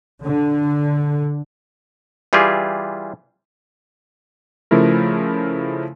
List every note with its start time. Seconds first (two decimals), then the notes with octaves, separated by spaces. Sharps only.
0.23 D3
2.33 E3 G3 F4 G4 G#4
4.71 C#3 F3 A3 E4 A#4